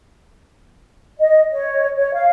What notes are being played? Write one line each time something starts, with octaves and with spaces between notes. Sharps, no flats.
D#5
C#5
C#5
F5